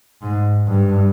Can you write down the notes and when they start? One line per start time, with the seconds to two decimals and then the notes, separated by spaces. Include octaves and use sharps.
0.22 G#2
0.67 G2